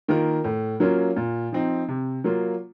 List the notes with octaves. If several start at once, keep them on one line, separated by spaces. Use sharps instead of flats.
D#3 A#3 F4 A#4
A2
F#3 A#3 C#4 F4
A#2
F3 C4 D#4
C3
F#3 A#3 F4